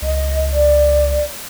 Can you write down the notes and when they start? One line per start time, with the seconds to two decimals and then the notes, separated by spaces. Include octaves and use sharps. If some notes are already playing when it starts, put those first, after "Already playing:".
0.02 C#2 D#5
0.51 D5